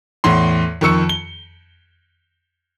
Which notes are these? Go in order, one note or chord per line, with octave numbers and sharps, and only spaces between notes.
E2 A2 C6
F2 D#3 C#6 E6 C#7
G7